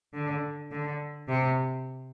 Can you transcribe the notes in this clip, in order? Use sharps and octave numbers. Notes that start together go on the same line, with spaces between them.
D3
D3
C3